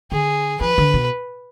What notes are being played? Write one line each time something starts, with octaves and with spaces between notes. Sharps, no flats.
D3 G#4
F3 B4
D3
B2